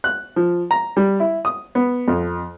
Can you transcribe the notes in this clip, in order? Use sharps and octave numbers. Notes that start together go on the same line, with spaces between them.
F#6
F3
A#5
G3
E4
D#6
B3
F2